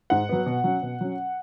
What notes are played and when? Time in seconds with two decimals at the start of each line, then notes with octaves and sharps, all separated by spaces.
0.10 G#2 F#5
0.29 F#3 B3
0.46 B2
0.64 F#3 C#4
0.83 B2
1.01 F#3 C#4